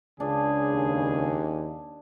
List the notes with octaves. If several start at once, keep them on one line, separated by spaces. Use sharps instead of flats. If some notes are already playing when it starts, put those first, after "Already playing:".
C#2 C#3 D4 G#4
D#2